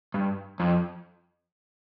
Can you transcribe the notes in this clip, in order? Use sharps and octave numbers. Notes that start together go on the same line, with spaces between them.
G2
F2